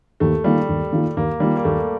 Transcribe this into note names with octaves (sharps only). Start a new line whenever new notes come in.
D#2 A3
D#3 G3 A#3 F4
D#2
D#3 A#3 F4
D#2 A#3
D#3 G3 A#3 F4
A#3
D#2 A3